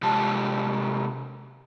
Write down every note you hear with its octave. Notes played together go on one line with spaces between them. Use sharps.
C3 F#3 G#3 F4 G4 A5